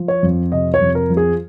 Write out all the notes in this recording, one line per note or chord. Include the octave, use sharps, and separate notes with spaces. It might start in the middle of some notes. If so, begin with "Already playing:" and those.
Already playing: F3
C#5
F2
C3 D#5
C#5
F2
A#4
F3
G#4